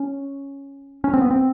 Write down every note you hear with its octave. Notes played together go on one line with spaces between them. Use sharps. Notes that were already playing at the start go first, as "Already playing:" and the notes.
Already playing: C#4
C#4
C4
B3
C4